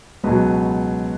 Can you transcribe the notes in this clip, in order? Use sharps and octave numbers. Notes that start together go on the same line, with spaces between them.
C#2 B2 F#3 B3